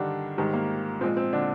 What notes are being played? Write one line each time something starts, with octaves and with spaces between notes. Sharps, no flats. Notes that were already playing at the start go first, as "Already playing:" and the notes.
Already playing: G2 D3 D#3 G3 D4
G#2 D#3 G3
A#3
A#2 F3 G#3 C4
C4
D3 D4